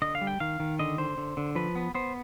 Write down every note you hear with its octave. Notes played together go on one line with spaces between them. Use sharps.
D3 D#5
F5
G3
G5
D#3 F5
D#3
D3 D#5
D3 C5
D3
D3
F3 B4
B3
B3 C5